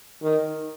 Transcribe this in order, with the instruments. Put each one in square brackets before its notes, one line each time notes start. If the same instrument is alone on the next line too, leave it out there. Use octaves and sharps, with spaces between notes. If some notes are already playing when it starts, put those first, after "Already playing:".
[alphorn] D#3